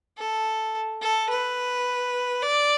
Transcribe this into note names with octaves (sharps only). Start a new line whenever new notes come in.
A4
A4
B4
D5